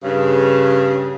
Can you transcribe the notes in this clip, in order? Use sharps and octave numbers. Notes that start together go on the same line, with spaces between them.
G2 C#3